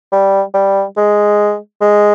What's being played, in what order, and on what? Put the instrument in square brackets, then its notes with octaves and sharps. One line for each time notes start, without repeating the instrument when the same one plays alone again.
[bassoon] G3
G3
G#3
G#3